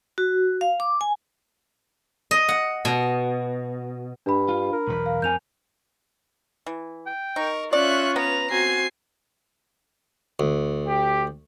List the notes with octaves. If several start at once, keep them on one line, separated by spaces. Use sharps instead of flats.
F#4
F5
D6
G#5
D#5
F#5
B2
G2 D4 B5
F4
A#4
B1 E2 B4
F5
F2 C4 G#5 G6 F7
E3
G5
D#4 A#4 C#6
C#4 F4 D5 E5 C#6 F#6
B3 B4 A#5 F7
C4 F#4 G#5 C7
D2
G4